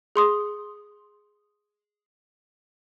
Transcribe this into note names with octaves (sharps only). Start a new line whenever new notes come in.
G#4 C6 D#6